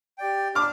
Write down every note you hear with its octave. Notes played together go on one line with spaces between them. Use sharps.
G4 D5 G5
D4 D6 F6